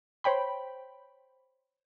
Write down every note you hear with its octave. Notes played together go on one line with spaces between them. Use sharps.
C5 C#5 G5 B5